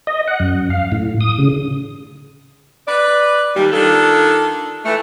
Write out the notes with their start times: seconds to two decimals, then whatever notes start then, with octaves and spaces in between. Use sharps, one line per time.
0.07 D#5
0.28 F#5
0.40 F#2
0.70 F5
0.92 A2
1.21 D#6
1.39 C#3
2.88 B4 D5
3.56 D#2 G3
3.72 D#3 D4 F4 A4
4.85 E3 A3